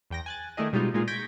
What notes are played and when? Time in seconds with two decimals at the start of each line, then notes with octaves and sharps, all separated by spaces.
0.10 E2 G5 A#6
0.26 G#5 F#6 A6
0.57 D#3 A3 D4 E4 G#4 D#5
0.73 B2 G3 G#3 D#4 F4 G4
0.94 A#2 G#3 D#4 F4 G#4
1.07 C#6 G6 G#6 A#6 B6 D7